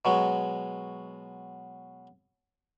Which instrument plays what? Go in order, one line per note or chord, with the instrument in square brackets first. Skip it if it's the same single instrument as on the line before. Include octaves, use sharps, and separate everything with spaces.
[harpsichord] B2 F#3 G#3